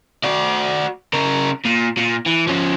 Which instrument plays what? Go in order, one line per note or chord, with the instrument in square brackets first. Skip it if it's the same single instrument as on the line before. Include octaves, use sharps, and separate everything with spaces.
[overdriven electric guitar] F#4 D5
C#3 A#4
A#2
A#2
E3
F3 C#4